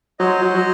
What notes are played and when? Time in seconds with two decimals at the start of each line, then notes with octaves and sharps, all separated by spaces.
0.19 F#3 C5 D#5
0.42 F#3
0.54 F#3